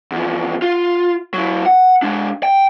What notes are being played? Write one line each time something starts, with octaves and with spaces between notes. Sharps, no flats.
E2 F3
F4
F#3 E4
F#5
G#3 D4
G5